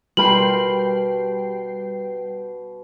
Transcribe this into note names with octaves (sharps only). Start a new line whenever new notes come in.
B2 G3 F4 A#4 G5 B5 C7 F#7